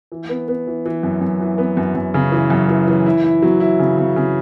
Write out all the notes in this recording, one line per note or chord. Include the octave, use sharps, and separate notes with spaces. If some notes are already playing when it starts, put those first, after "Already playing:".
E3
B3
B3
E3
E3
F#2
F#2
E3
B3
F#2
F#2
C#3
E3
F#2
E3
E3
E4
E4
F#3
E4
C#3
C#3
C#3